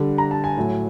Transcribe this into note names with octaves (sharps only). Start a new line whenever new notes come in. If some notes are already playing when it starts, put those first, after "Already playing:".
Already playing: D3 G3
A#5
A5
G#5
A2 F#3